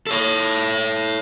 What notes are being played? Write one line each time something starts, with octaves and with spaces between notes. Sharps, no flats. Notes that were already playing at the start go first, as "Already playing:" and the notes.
A4 C#5